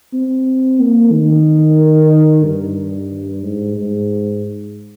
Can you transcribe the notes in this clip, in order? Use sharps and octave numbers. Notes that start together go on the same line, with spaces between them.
C4
A#3
D#3
G2
G#2
G#2